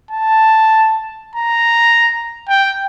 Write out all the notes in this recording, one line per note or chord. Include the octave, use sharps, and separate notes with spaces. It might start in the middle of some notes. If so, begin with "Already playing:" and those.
A5
A#5
G5